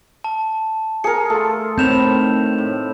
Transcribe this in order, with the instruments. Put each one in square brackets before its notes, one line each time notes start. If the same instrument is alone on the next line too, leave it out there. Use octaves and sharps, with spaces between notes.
[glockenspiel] A5
[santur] G#4 A#4 [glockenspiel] C#7
[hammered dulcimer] A3 F4 [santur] A4
[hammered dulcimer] A2 D#3 B5 [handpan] C4 [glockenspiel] G6 E7 F7
[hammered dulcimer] A2